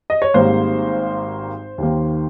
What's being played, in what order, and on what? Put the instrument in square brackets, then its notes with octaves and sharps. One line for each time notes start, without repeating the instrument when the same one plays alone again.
[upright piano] D#5
C#5
G#1 G#2 G3 A#3 C5
D#2 D#3 A#3